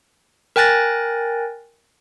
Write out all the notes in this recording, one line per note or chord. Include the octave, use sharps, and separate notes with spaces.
A#4 G5 G#5 F#6 A6 A#6